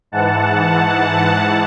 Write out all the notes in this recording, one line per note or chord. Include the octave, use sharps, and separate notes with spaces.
G#2 E3 F#5 A5